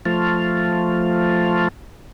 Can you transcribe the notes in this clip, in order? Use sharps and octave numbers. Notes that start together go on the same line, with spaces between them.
F3 A3 F4